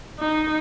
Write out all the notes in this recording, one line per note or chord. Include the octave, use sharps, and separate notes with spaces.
D#4